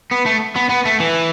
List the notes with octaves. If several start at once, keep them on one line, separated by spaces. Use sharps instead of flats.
B3
A3
B3
B3
A3
E3